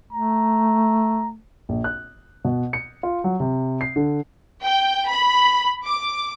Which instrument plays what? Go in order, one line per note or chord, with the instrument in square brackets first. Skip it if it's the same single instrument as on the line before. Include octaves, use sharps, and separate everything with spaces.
[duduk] A3 [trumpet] A#5
[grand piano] A#1
F#6
B2
C#7
F4
F#3
C3
C7
D3
[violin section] G5
B5
D6